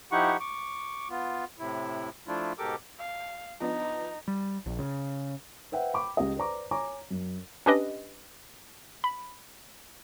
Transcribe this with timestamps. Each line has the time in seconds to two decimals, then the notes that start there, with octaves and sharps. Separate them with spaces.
0.12 F3 D#4 E4 G4 F#5 C#6
0.40 C#6 D6
1.10 B3 F4
1.59 A2 C3 E4
2.27 F3 A3 D4 E4 F4
2.58 G#2 B2 G4 A4 A#4 D6
2.99 F5
3.60 F3 B3 D4 D#4
4.28 G3
4.66 A#1
4.79 C#3
5.72 B4 C5 E5 F#5 G5
5.94 G5 B5 D6
6.17 C#2 G4 D#5
6.37 B4 C5 D5 A#5 D6
6.71 C#5 G#5 A#5 D6
7.11 F#2
7.66 C#4 D4 G4 B4 D#5
9.04 B5